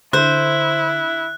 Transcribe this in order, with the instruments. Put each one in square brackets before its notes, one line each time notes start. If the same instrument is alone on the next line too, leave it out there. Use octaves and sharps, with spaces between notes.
[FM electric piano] D3 [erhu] E4 [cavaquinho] C5 [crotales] F#6